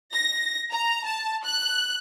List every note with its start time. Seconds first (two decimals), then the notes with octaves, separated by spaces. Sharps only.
0.13 A#6
0.72 A#5
1.05 A5
1.44 F#6